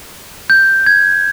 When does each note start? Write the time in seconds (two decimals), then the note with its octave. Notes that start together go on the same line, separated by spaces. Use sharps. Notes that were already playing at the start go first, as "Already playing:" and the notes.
0.50 G6
0.86 G#6